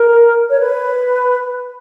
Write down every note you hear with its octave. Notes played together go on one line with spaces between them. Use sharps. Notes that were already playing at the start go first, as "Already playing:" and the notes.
Already playing: A#4
C#5
B4